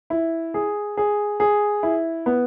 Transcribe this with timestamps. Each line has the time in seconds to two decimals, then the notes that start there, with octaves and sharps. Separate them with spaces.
0.10 E4
0.54 G#4
0.97 G#4
1.40 G#4
1.83 E4
2.26 B3